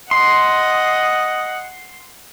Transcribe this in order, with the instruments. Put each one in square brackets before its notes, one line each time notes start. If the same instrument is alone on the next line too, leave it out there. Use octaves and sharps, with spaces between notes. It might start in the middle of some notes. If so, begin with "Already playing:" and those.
[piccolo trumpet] D#5 [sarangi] F#5 [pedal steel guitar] C6